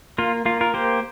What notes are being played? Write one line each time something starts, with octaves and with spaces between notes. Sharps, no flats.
A#3 F4
A#3 F4
F4 A#4
A#3 G4 C5